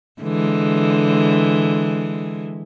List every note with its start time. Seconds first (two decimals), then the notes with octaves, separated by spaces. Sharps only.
0.21 D3 E3 G#3